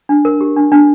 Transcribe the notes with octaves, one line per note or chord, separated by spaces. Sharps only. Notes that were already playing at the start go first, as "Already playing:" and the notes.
D4
A#4
G4
D4
D4